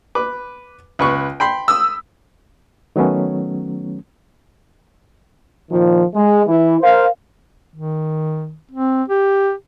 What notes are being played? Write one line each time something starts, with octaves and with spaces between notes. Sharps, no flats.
B4 D6
C#2 B4 C#6
G5 B5 C6
D#6 E6
D#3 F#3 A3 B3 C#4
A#2 D#3 F3
G#3
E3 E4
A#4 C5 F5
D#3
C4
G4